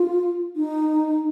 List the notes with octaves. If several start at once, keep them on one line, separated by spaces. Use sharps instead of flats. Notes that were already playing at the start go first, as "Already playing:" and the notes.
Already playing: F4
D#4